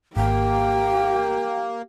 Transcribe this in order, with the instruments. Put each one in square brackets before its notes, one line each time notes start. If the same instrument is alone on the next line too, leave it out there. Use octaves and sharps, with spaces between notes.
[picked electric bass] G#1 [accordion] A#3 [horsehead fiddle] G4 [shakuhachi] G5